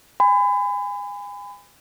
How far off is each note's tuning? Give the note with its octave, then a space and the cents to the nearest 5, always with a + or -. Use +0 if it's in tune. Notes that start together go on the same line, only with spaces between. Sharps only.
G#5 -30 B5 +35